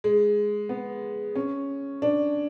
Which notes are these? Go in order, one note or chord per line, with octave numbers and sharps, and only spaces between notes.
G#3
B3
C#4
D4